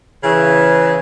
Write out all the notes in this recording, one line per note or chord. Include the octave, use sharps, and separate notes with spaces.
C#3 E3